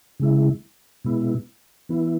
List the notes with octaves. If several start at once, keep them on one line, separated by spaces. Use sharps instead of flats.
C#3 G#3 E4
B2 G#3 B3 E4
E3 B3 E4